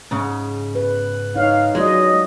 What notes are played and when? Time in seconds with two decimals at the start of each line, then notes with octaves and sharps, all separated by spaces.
0.11 G#2 C#3
0.75 B4
1.36 D#4 C#5 F5
1.75 F#3 G#3 F4 D5 D#5